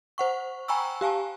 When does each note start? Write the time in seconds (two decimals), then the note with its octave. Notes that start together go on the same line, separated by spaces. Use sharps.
0.18 C5 F#5 C#6
0.68 G5 G#5 A#5 B5 C#6 E6
1.01 G4 F5 G#5 A5